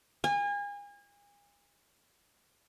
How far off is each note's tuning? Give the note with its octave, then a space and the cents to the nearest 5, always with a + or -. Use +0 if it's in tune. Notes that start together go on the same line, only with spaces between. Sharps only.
G#5 -35